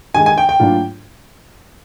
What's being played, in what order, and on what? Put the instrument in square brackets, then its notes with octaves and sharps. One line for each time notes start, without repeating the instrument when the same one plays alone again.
[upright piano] G2 D#3 G#3 [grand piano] G#5
[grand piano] G#5
G5
G5
[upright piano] A2 F#3 A#3 D4 F4